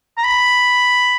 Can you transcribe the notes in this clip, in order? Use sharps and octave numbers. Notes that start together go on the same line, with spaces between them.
A#5
B5